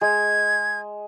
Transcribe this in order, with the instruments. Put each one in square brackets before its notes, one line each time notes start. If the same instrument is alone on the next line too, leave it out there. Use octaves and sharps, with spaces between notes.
[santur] G#3 [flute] G#6